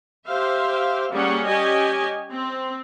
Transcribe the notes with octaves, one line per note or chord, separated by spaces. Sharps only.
G4 C5 E5 F5
G3 A#3 C#4 G#4 F#5
C#4 G4 D#5 G#5
C4